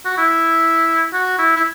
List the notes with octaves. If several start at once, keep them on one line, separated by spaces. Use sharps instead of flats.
F#4
E4
F#4
E4
E4